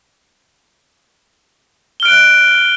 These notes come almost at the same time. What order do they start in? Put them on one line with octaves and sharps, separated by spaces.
G7 F6 D7 F#6